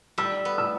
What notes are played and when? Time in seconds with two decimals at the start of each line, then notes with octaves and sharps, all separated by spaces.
0.18 G3 E6
0.45 B3
0.58 E6